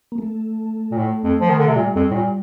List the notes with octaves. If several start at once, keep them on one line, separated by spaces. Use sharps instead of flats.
A#3
A3
A#2
A2
F2
F3
D#3
D3
C3
A#2 G3
F2
A2
A#2